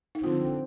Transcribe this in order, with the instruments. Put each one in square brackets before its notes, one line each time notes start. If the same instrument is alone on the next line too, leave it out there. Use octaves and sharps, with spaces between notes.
[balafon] D#4
[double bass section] D3 F3 C4 [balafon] F4